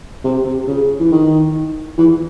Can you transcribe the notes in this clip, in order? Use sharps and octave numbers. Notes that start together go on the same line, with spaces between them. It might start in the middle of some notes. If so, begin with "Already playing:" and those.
C3
C3
C#3
E3
D#3
E3